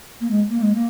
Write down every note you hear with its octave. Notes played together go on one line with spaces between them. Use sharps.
A#3
G#3
A#3
G#3
A#3